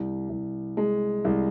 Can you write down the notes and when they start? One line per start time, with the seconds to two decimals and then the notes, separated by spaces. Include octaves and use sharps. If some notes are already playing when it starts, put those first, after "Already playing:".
Already playing: C2
0.29 C2
0.77 G#3
1.25 C2